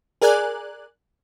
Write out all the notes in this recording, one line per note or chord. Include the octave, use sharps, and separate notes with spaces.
G#4 A#4 D5 G#5 F#6